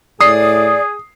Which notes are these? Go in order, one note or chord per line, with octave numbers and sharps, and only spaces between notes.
A2 G#4 D5 D#6 C7